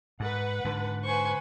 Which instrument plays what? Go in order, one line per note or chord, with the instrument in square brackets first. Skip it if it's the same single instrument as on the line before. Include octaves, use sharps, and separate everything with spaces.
[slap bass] G#2 [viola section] B4 F#5
[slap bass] G#2 D3
[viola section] B4 C5 [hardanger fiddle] G#5 C#6